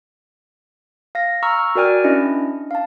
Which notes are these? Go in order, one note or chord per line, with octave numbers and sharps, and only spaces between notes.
F5 A#6
A#5 C#6 E6 F6
F#4 A#4 D5 G5 G#5 F6
C#4 D4 E4 D#5
F5 A5